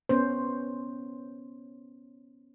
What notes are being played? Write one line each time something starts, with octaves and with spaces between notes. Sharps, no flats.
B3 C#4 C5